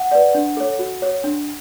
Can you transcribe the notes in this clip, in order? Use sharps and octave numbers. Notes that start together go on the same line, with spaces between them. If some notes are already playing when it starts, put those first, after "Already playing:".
Already playing: F#5
B4 D5
D4
A4 C#5
F#4
C#5
D4